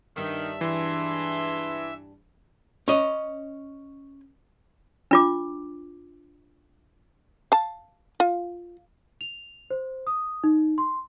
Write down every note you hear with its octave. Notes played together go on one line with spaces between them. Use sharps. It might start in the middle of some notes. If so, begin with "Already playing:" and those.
G2 D#3 D4 G4 E5
E3 G#3 A5 C6
C#4 D#5
D4 F4 D6
F5 A5
F4
F7
C5
D#6
D#4
C6